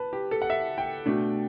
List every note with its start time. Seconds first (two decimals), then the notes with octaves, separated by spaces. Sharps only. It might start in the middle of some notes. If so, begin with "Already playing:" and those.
Already playing: B4 A5
0.13 G4
0.31 A4
0.42 F#5
0.50 E5
0.78 G5
1.06 B2 A3 D4